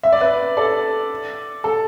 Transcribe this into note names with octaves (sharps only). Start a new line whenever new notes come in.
E5
D5
B4 E5
A4 D5
A4